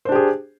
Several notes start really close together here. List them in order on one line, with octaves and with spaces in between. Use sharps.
C5 D4 G4 G#4